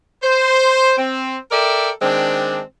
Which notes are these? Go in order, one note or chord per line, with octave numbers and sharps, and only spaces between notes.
C5
C4
A4 A#4 D5 E5 G5
D#3 G#3 C4 D4